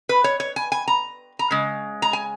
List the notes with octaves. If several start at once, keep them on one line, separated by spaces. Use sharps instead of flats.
B4
C#5
C#5
G#5
G#5
A#5
A#5
C#3 G#3
A#5
G#5